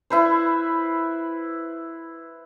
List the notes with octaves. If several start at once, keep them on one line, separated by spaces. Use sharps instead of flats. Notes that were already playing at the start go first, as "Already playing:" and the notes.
E4 B4 C5